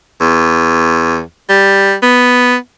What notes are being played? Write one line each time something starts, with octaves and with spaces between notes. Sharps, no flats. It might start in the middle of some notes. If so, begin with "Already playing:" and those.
E2
G3
B3